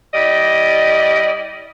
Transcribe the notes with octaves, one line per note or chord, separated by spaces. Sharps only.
G3 E4 D5 D#5